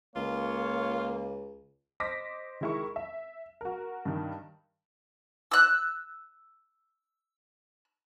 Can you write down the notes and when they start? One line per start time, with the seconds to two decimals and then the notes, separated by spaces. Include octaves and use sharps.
0.16 C#2 A#3 F4 C#5
2.00 C5 D#5 D6 A#6 B6
2.61 D#3 G#3 E4 A#4 C#6
2.96 E5
3.61 F#4 A#4
4.05 G2 D#3
5.52 E6 F#6